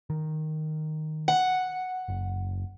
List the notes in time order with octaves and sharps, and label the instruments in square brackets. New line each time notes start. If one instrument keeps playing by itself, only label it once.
[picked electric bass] D#3
[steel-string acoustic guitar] F#5
[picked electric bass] F#1